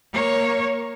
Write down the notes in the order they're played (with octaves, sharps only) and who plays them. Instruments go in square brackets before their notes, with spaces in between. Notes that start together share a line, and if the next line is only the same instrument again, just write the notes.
[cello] A#3 C#5